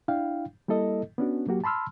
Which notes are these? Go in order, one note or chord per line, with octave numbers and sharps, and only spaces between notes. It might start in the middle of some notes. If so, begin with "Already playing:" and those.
D4 E4 F5 G5
G3 A#3 E4 A4 D#5
B3 C#4 D4 F#4
F#3 A#3 F#4 G4
A5 B5 C6 E6 F6